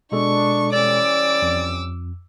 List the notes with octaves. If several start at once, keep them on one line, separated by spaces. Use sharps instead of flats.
B2 G#3 D4 A4 C#6
E3 G3 C#4 D5 D6 E6
F2